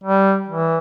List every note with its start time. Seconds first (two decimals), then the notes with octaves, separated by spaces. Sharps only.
0.04 G3
0.49 E3